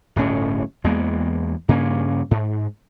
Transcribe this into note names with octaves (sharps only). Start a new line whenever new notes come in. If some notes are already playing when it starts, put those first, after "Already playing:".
D1 G1 A2 C#4
E2 G#3 A#3 B3
G2 C#3 A#3 C#4
G#2